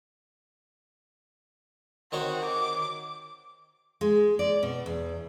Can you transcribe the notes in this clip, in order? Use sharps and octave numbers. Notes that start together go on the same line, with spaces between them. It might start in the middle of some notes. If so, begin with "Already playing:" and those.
D#3 C4 F#4 C#5
D6
G#3
D5
B2
E2